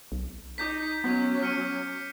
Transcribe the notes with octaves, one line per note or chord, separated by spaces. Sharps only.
B1
D#4 D6 G6 B6
F#3 B3 C#4
F6 C#7 D#7